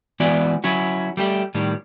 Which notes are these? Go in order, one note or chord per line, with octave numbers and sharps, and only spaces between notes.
E3 G#3 B3 E4 F#4 D5
F#3 C#4 E4 F#4
G3 A3 G4
A2 D#3 G3